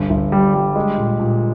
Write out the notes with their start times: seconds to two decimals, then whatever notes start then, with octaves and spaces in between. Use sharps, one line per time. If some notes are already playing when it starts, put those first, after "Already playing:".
Already playing: G1
0.10 G1
0.32 G3
0.54 G3
0.76 G#3
0.97 A#2
1.20 A#2